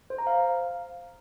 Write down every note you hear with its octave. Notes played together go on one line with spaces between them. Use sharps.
C5
A#5
F5